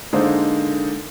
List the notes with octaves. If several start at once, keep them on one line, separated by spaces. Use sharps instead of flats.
D3 G#3 A#3 D#4 A4 C5